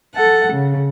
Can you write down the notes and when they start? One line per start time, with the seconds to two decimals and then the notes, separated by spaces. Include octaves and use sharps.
0.14 A4 F#5
0.53 C#3